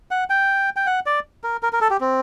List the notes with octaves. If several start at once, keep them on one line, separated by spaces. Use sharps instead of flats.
F#5
G5
G5
F#5
D5
A#4
A#4
A#4
A4
G4
C4